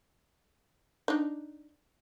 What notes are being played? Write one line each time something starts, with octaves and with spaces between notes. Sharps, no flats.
D4 D#4